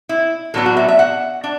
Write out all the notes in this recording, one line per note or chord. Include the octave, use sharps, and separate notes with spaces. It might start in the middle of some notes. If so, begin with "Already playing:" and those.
E4
A2 F#3 B3 D4 A4
F#4
E5
E5
F#5
D4